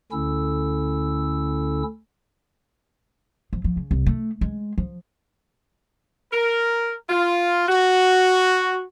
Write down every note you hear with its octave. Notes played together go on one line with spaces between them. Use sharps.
D2 D3 C#4 E4 A4 E6
F3
F3
C#3
C2
A3
G#3
F3
A#4
F4
F#4